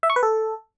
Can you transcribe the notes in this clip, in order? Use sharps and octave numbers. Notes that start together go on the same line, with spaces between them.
E5
C#6
B4
A4